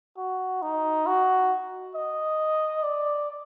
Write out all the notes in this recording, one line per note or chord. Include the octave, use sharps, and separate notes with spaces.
F#4
D#4
F#4
D#5
D5